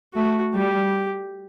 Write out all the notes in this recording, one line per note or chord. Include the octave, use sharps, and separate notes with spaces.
A3 F#4
G3 G4